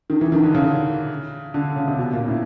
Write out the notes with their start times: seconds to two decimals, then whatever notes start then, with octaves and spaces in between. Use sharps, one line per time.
0.10 D#3
0.21 E3
0.32 D#3
0.43 D3
0.55 C#3
1.54 D3
1.76 C#3
1.88 C3
1.98 B2
2.13 A#2
2.28 A2